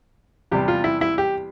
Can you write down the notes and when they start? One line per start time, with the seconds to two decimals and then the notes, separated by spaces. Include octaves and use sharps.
0.51 E2 C3 G3 G4
0.68 F4
0.84 E4
1.01 E4
1.18 G4